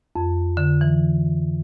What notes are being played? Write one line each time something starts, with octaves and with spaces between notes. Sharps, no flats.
F2
D3
E3